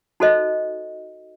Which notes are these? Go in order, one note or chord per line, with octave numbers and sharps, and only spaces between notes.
D#4 F#4 A4 C5 D#5